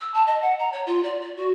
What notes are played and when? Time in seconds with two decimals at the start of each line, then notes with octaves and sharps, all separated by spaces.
0.01 E6
0.14 A5
0.27 D#5
0.42 F#5
0.59 A#5
0.72 C#5
0.86 F4
1.03 D5
1.21 D5
1.37 F#4